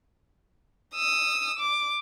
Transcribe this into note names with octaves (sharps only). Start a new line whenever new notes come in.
D#6 E6
D6